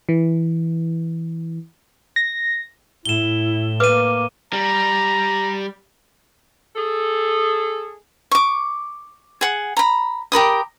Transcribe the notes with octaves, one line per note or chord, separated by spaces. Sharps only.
E3
A#6
A2 E4 E7 G7
A#3 B4 D6 D#7
G3 A#5
G#4 A4
C#6 D6
G#4 F#5
A#5 B5
G4 A#4 B5 D#6